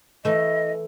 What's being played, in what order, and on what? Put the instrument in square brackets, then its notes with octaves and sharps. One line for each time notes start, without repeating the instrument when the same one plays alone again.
[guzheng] E3 A3 [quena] D#5